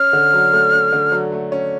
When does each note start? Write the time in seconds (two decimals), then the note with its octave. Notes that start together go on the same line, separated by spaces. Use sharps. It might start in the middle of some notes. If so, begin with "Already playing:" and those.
Already playing: C#4 F6
0.13 D3
0.34 F#3
0.53 A3
0.73 C#4
0.92 D3
1.12 F#3
1.32 A3
1.52 C#4